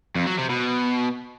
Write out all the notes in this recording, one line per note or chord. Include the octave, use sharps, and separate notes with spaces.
F2
F#3
C3
B2